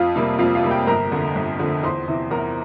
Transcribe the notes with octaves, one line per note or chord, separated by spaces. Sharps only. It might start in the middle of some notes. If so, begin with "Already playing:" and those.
Already playing: F2 F4 F5
C3 G3 A#3
F2 F4 F5
F4 F5
C3 G3 A#3
G4 G5
G1 A#4 A#5
F2 D3
G1
F2 D3
E2 C5 C6
C3 E3
E2 A#4 A#5